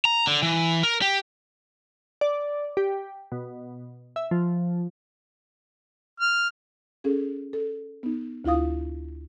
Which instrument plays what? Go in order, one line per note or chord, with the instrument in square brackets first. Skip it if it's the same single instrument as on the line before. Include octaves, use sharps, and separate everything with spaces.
[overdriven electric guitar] A#5
D3
E3
A#4
G4
[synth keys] D5
G4
B2
E5
F3
[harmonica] F6
[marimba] C#4 G#4 A4
A4
B3 D#4
D2 E4 F4 F5 D#6